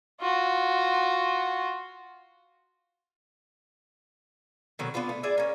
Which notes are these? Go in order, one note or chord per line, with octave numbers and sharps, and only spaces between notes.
F4 F#4
B2 D3 D#3 F#3
B3 D4 F4 B4
A3
G#4 D5 E5
A#3 C#4